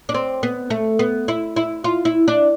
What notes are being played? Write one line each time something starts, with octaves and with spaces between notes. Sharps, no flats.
D4
C4
B3
A3
B3
E4
E4
F4
E4
D4